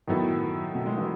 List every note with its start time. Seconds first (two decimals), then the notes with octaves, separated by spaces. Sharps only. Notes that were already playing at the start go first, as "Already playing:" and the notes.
0.07 A2 D#3 F#3 B3 E4 A4
0.75 B2
0.86 G#3
0.97 E3